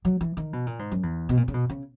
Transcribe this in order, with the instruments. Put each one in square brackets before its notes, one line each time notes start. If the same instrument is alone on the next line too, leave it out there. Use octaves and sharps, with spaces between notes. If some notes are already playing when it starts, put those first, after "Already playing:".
[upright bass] F#3
E3
D#3
B2
A#2
G#2
F#2
E2
B2
A#2
C#3
B2
C#3